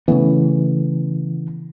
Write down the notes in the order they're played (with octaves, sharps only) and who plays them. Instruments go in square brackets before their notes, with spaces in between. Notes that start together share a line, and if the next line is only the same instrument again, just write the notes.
[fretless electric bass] C#3 A3 B3 [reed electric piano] E3